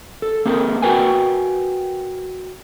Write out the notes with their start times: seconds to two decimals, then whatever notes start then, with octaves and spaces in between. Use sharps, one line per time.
0.22 A4
0.45 A#3 C4 G#4 A#4
0.82 F#4 A#4 B4 G5 G#5